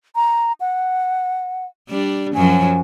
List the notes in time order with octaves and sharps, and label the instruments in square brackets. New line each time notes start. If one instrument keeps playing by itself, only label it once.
[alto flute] A#5
F#5
[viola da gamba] G3 D4
[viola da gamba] F#2 F3 F#3 [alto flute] G#5